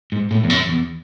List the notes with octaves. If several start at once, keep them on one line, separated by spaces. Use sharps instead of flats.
G#2
A2
E2
F#2
E2